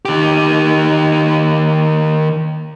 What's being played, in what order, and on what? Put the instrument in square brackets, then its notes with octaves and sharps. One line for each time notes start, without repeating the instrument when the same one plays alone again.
[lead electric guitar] D#3 G4